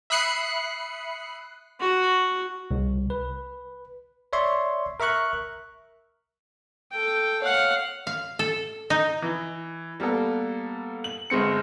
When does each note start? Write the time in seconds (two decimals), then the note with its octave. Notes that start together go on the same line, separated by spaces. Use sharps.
0.10 E5 B5 D#6 F#6 C7 C#7
1.80 F#4
2.71 C2
3.10 B4
4.33 C#5 D5 E5 C6 C#6
5.00 A#4 E5 A#5 C#6 F#6
6.92 A4 G5
7.42 C#5 F5 F#5 F#6
8.07 F5
8.39 A4
8.90 D#4
9.22 E3
10.00 G3 A#3 B3 A4
11.04 F#7
11.30 G1 G#3 C4 C#7